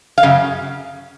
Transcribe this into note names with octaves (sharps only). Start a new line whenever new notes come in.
F5
F#2 C#3